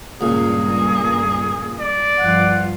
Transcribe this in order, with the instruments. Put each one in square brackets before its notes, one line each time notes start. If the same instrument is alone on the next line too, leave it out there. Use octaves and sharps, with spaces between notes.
[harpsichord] C#2 A#2 [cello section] G2 A#3 [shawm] G#4
[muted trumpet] D5
[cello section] G2 F3 F4 [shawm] F#5